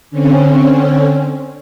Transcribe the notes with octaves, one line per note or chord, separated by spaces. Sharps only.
D3 C4 C#4